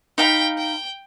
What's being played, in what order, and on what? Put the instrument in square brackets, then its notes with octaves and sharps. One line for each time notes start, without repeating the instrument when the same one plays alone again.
[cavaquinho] D#4 F5 B5 [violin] G5
[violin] G5